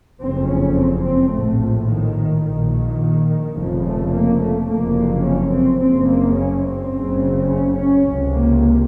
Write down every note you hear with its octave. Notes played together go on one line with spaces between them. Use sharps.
F#1 F2 C#3 C4
C#4
C4
C4
A#1 A2 A3
F3
D#3
A#1 A#2 D#3
F1 F2 C#3 F3
A3
A#3
A3
F#1 F2 C3 A#3
C#4
C4
F#1 F#2 C#3 C4
A#3
C#4
C4
F#1 F#2 C#3
C#4
C#4
C#2 C3
A#3